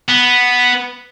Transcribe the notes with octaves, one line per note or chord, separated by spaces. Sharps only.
B3